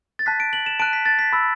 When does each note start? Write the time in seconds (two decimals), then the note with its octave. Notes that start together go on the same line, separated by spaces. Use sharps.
0.19 A6
0.26 A5 F#6 B6
0.40 D7
0.53 F#7
0.66 E7
0.80 A5 F#6 D7
0.93 B6
1.06 A6
1.19 B6
1.33 B5 E6